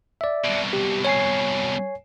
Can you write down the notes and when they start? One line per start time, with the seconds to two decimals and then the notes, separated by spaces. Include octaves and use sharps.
0.21 D5 E5
0.45 C2 B2
0.73 G4
1.05 C#5 G#5 C7